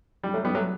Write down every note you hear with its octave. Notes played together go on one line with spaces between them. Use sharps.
G3
F#3 A3
G3 B3
F#3 A3